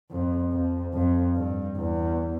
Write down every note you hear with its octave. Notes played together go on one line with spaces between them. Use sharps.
F2
F2
F2
G2
E2